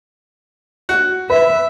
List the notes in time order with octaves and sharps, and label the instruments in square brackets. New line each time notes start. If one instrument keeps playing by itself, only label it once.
[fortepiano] F#4
[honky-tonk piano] B4 [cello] E5